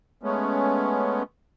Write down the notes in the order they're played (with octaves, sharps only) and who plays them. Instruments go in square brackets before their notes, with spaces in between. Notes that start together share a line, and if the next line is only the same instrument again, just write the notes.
[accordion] G#3 A3 B3 C#4